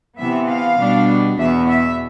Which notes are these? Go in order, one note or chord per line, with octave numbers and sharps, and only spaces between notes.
C3 E3 B3 E5
F5
B2 G3 B3 D4
E2 B2 B3 E5
E5